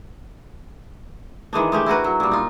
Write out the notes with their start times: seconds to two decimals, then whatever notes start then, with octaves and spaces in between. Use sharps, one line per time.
1.53 D#3 E3 G#3 D4
1.72 G#3 A3 G4
1.86 E4 F#4 A#4 B4
2.04 F#3
2.20 A#2 G3
2.31 D#4 F4